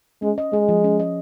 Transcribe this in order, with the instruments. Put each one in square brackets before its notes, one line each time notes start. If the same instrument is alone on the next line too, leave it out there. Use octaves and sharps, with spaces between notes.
[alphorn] G#3 [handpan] C#4
[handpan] D#5
[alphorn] G#3 [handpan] G#4
[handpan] F3
C#4
D#5